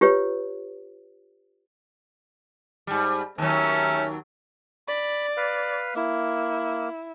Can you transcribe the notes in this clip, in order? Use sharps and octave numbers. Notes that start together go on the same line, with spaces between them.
F4 G4 B4 C#5
G#2 G3
D#2 F#3 A3 C#4
D5 B5
B4 F5
A#3 E4